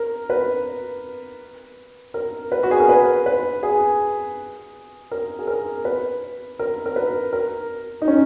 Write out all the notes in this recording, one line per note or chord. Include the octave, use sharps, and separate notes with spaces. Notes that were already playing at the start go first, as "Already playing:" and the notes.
Already playing: A#4
B4
A#4
B4
F#4
G#4
A#4
B4
B4
G#4
A#4
G#4
A#4
B4
A#4
A#4
B4
A#4
D#4
C#4